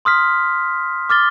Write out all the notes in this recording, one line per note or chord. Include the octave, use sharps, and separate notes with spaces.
C6 D#6 F6 B6
D6 F6 A6 G7